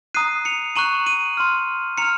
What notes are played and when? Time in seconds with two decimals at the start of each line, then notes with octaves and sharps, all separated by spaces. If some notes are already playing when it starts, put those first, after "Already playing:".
0.14 A#5 D#6 F#6 C7 D#7
0.45 C#7 F7
0.76 A#5 C#6 F#6 D#7 F#7
1.06 D#7 F#7
1.37 C6 F6
1.98 A#5 F6 C#7 F7